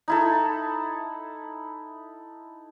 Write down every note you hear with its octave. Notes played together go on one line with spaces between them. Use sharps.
D#4 E4 A4